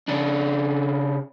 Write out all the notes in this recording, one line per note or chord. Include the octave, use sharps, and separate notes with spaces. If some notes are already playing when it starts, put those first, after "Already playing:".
C#3 D4